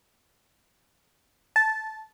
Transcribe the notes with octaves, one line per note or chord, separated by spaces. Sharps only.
A5